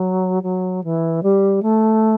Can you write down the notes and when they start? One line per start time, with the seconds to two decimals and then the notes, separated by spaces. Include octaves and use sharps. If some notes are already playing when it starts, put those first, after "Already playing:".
Already playing: F#3
0.43 F#3
0.83 E3
1.22 G3
1.62 A3